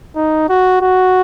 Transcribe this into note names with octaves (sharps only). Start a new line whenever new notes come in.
D#4
F#4
F#4